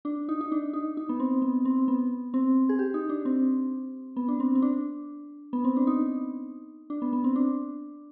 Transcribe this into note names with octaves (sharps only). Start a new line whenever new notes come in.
D4
D#4
D#4
D4
D#4
D#4
B3
C4
B3
C4
B3
C4
G#4
G4
D#4
D4
C4
B3
D4
C4
C4
D4
B3
C4
D4
D#4
D4
B3
B3
C4
D4